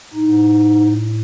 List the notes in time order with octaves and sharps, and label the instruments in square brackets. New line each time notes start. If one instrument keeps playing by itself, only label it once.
[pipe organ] A2 D#4